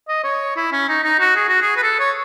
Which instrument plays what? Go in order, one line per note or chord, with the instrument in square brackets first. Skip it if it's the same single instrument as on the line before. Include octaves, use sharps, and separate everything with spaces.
[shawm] D#5
C#5
E4
C#4
D#4
D#4
F#4
G#4
F#4
G#4
B4
A4
C#5